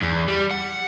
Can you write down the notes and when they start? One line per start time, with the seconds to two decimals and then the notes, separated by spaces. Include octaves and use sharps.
0.02 E2
0.28 G3
0.51 F#5